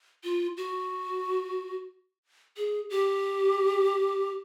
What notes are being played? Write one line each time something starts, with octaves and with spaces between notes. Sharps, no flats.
F4
F#4
G#4
G4